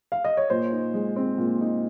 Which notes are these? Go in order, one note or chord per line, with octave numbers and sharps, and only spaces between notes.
F5
D#5
C#5
A#2 C5
D#4
G#3
C4
A#2
D#4